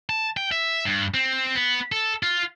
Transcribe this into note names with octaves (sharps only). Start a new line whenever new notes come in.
A5
G5
E5
G2
C4
B3
A4
F4